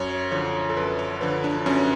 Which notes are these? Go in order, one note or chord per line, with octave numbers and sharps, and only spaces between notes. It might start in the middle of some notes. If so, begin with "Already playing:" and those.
Already playing: F#2 C#5
D3 F3 C#5
A4
F#2 B4
C#5
D3 F3 B4
D4
F#2 C#4